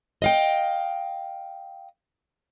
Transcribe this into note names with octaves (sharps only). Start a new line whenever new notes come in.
D#5 F5 G5